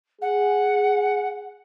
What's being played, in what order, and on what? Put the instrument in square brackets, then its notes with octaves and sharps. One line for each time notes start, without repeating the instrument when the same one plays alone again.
[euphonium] G#4 [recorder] F#5